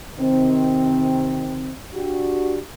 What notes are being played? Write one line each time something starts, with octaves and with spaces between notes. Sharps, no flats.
C3 D#3 C4
D4 F#4 G4